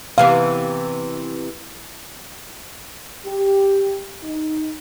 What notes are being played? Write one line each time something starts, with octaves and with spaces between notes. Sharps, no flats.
C3 E3 B3 F5
G4
D#4